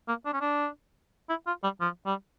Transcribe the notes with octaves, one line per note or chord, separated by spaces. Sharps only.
A#3
D4
C#4
D4
E4
F4
G3
F3
G3